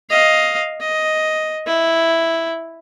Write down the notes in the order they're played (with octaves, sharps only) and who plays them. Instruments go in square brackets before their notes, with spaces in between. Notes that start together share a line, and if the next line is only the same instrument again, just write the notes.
[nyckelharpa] D#5 F5
D#5
E4